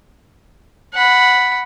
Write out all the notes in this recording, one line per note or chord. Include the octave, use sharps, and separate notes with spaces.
F#5 B5